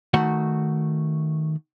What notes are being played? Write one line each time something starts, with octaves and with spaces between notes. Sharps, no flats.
D#3 A3 F#4 F#5